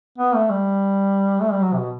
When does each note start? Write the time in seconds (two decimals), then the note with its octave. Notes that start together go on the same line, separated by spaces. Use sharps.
0.18 B3
0.34 A3
0.50 G3
1.41 A3
1.51 G3
1.62 F#3
1.73 C3
1.77 B2